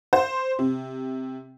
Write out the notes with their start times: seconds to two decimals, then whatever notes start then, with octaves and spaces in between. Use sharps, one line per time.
0.13 C5
0.59 C3